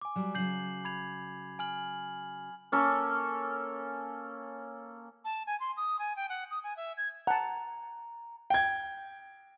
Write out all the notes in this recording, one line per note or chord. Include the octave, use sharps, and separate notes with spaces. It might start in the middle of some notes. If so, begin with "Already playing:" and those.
G#5 D6
F#3 G3
C#3 F#3 G6 C7 F#7
B5 G#6 F7
G#5 F6 F#7
A#3 C#4 A4
A5
G#5
C6
D#6
G#5
G5
F#5
D#6
G#5
E5
G#6
F#5 A5 A#5
G5 G#6